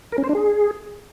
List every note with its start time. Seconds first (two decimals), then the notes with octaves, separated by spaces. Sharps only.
0.12 A#4
0.18 C#4
0.24 C5
0.29 D4
0.35 G#4